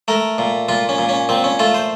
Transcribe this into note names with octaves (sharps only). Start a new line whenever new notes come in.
A3 A#4
A#2
A#2 F4
C#4
A#2
C#4
A#2 C4
C#4
A3 F4
C5